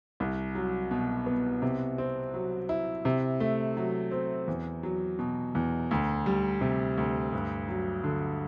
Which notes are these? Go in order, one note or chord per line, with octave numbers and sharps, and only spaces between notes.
C2
F#3
B2
B3
C3
C4
F#3
E4
C3
A3
F#3
C4
E2
F#3
B2
E2
D2
G3
C3
D2
G2
F#3
D3